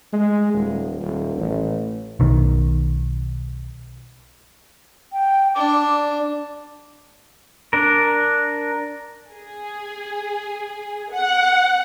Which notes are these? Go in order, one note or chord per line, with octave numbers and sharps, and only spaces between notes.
G#3
D#1
D#1
A1
B1 D#3
G5
D4 D6
D4 A#4
G#4
F#5